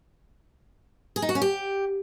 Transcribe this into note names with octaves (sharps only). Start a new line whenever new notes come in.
G#4
D#4
F#4
C#4
G4